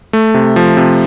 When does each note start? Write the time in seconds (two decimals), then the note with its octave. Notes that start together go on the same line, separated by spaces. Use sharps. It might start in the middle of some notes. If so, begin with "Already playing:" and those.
0.13 A3
0.34 C3
0.56 F3
0.77 C3